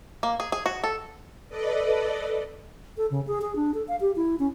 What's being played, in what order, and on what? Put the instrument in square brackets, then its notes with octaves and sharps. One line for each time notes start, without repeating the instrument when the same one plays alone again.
[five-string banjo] A#3
G#4
G#4
F#4
A4
[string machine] A4 B4 D5 D#5
[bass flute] A4
C#3
G#4
G#4
D4
A4
F5
G4
E4
C#4